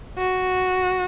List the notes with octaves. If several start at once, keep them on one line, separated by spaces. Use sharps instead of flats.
F#4